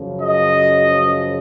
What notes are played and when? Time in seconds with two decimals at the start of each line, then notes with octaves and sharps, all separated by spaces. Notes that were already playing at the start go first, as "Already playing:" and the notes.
Already playing: F#2 C#3 F3
0.21 D#5